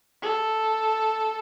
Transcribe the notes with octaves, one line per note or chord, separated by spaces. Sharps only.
A4